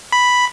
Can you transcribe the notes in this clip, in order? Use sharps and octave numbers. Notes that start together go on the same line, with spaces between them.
B5